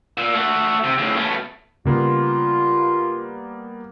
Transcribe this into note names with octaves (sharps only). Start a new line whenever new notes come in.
A#2 E6
A3 F#4 E5
C3
A2 C#3
B2 A3 C#4
C#3 G3 A#3 B3 F4